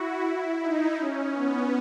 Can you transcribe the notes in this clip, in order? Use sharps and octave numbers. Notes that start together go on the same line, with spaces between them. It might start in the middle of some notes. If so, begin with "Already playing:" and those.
Already playing: E4 F#4
E4
D#4
C#4
B3